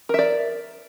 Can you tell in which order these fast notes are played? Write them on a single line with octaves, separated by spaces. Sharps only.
A#4 E5 D5